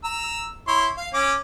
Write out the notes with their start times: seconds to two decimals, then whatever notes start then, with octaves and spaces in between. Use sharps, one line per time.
0.04 A#5 E6
0.67 E4 C#5 C6
0.97 F5
1.14 C#4 D6